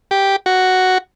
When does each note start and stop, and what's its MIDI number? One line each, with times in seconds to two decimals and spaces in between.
0.11 0.36 67
0.46 0.98 66